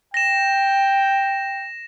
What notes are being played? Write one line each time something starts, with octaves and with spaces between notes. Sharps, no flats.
G5 A#6 E7